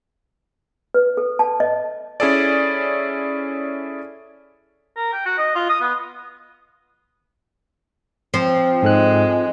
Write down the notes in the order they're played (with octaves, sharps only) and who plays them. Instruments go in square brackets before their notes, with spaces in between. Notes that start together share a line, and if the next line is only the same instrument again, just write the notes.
[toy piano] B4
A4
A5
D#5
[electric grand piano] C#4 E4 G#4 A4 D5
[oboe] A#4
G5
F#4
D#5
F4
D#6
B3
[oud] F3 C4
[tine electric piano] G#2 A4 F#6 [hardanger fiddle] G#3